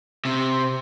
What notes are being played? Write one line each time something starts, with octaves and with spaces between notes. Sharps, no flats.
C3